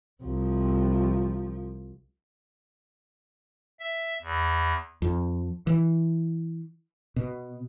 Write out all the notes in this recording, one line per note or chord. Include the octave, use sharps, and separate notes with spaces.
C2 F3
E5
E2
F2
E3
B2